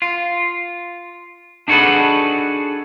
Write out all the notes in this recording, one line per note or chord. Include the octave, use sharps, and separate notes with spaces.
F4
D4 D#4 F#4 G#4 A4 B4